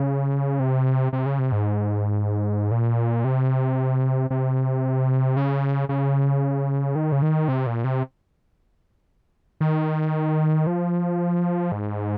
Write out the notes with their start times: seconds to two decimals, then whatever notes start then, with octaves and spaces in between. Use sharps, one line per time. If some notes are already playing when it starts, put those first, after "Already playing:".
Already playing: C#3
0.60 C3
1.13 C3
1.26 C#3
1.39 C3
1.52 G#2
2.71 A#2
3.25 C3
4.30 C3
5.37 C#3
5.89 C#3
6.95 D#3
7.12 C#3
7.22 D#3
7.48 C3
7.67 A#2
7.84 C3
9.61 D#3
10.67 F3
11.72 G#2